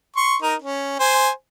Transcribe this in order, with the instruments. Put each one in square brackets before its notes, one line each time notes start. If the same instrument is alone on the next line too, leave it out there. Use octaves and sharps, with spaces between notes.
[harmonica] C6 C#6
D#4 A#4
C#4
C5 G#5